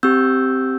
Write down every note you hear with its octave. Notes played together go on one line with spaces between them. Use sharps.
C4 G4 E6 G6